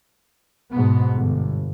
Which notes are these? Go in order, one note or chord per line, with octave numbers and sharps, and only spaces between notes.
G#2 B2 B3
G1